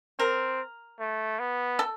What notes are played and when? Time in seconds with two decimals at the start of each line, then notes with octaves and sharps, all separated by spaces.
0.19 C4 A#4
1.00 A3
1.39 B3
1.79 A4